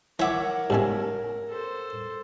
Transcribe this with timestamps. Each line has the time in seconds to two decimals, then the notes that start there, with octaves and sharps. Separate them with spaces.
0.19 E3 A#4 C#5 E5 F#5 D6
0.70 G#2 C#3 A3 G4 E5 G#5
1.48 A4 C5